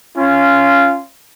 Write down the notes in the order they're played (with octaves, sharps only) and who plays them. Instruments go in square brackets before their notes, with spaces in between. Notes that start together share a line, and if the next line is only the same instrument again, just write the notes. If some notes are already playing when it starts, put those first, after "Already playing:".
[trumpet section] C#4 F4